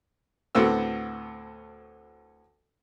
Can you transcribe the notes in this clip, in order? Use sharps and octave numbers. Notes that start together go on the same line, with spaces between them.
D2 A2 B3 C4 F#4 E6